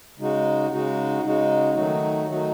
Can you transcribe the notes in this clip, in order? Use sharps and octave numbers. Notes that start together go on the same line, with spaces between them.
C#3 G#3 D#4 F#4
C#3 G#3 D#4 F#4
C#3 G#3 D#4 F#4
D#3 F#3 A3 D#4 F#4
D#3 F#3 A3 D#4 F#4